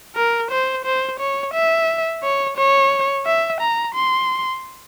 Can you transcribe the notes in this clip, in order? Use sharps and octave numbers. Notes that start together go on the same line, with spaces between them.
A#4
C5
C5
C#5
E5
C#5
C#5
E5
A#5
C6